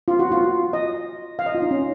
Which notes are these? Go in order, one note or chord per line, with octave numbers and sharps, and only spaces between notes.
F4
F#4
F4
D#5
F5
D#5
F4
D#4
C#4